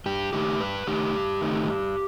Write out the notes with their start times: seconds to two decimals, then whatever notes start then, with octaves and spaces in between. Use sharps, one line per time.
0.06 G2 G4
0.33 D#3 A3 D#4 G4
0.60 G2 B4
0.87 D#3 A3 D#4 G4
1.14 G2
1.41 D#3 A3 D#4
1.68 G2